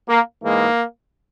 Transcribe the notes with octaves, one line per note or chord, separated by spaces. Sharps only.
A#3
G#2 E3 G#3 A#3